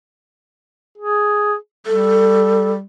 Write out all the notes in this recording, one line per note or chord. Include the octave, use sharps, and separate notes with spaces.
G#4
G3 A4